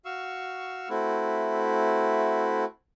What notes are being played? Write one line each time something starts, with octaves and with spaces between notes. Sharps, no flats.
F#4 F5 C#6 E6
A3 C4 E4 F#4